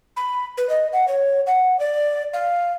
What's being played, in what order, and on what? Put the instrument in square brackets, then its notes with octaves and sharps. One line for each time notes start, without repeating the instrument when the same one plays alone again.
[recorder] B5
B4
D#5
F#5
C#5
F#5
D5
F5